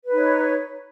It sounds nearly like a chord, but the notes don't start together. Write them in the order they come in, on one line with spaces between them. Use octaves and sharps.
B4 D#4 C#5